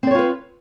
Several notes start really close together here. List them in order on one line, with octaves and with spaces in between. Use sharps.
C4 D5 C#5 F4 B4